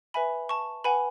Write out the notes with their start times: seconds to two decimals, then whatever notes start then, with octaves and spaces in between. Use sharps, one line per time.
0.14 B4 E5 G#5 B5
0.49 A5 C#6
0.84 B4 F#5 G#5 B5